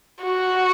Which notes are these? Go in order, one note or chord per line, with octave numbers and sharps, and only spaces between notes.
F#4